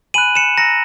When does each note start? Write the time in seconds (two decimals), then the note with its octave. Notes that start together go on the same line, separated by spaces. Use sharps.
0.14 G#5 B5 F#6 D#7 F#7
0.35 C#7 E7
0.57 A#5 E6 A#6 C#7